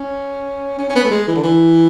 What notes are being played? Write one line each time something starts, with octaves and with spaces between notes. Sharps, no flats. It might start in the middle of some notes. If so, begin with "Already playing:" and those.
Already playing: C#4
C#4
C#4
B3
A3
G#3
E3
D3
E3